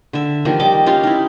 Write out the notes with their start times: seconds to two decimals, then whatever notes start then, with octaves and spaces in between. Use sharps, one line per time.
0.13 D3 E5
0.45 D#3 F3 G3 A#3
0.59 G3 D#5 D6
0.86 C#4 F4 G4 C6
1.03 D#4 E4